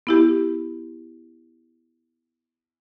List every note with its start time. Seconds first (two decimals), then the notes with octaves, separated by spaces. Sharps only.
0.07 B3 E4 G4